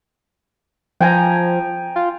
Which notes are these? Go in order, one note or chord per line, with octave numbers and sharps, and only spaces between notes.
F3 G5 G#5 A#5
F4